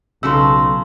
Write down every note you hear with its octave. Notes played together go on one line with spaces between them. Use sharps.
B1 C#3 F#3 A4 C6 E6